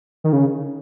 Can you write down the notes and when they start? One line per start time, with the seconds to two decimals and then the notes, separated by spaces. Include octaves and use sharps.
0.24 D#3
0.33 C#3